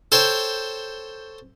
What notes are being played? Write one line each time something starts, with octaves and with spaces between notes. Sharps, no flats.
A4 C5 C#5 G5